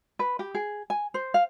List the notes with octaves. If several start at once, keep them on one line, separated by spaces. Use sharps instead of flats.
B4
G4
G#4
G#5
C5
F5